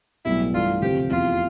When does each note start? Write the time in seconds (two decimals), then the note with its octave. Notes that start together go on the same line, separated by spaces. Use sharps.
0.25 B1 A2 G3 B3 E4
0.53 G2 E3 A3 D4 F4
0.82 D2 C3 F3 C4 G4
1.10 F1 E2 C3 F4